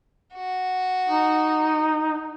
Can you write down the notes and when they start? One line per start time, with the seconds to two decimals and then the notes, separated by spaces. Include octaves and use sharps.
0.35 F#4
1.09 D#4